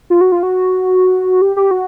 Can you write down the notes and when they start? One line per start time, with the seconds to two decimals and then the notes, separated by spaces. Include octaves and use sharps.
0.10 F4
0.21 F#4
0.32 F4
0.43 F#4
1.41 G4
1.56 G4
1.71 F#4